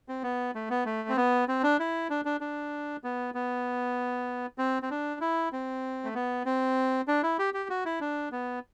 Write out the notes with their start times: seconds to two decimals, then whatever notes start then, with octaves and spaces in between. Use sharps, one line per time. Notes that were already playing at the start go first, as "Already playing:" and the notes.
0.09 C4
0.23 B3
0.55 A3
0.70 B3
0.85 A3
1.09 C4
1.17 B3
1.48 C4
1.63 D4
1.80 E4
2.10 D4
2.25 D4
2.41 D4
3.04 B3
3.34 B3
4.58 C4
4.82 C4
4.91 D4
5.21 E4
5.52 C4
6.04 A3
6.15 B3
6.45 C4
7.08 D4
7.23 E4
7.39 G4
7.54 G4
7.70 F#4
7.85 E4
8.01 D4
8.32 B3